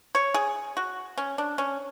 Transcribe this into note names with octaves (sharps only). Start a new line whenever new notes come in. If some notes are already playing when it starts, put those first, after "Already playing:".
C#5
G#4
F#4
C#4
D4
C#4